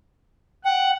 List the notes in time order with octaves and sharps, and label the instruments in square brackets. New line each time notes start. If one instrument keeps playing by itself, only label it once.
[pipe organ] F#5 [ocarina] G5